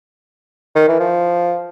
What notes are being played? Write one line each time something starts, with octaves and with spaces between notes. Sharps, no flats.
D#3
E3
F3